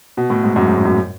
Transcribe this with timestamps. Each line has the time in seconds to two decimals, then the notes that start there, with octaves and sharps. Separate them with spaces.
0.17 B2
0.30 A2
0.43 G#2
0.56 F#2
0.66 G#2
0.76 A2
0.85 F#2